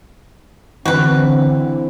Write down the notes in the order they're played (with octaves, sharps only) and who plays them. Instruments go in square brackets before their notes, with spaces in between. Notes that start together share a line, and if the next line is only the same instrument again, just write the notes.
[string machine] D3 [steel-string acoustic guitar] E3 [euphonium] C4 [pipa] F#4 B4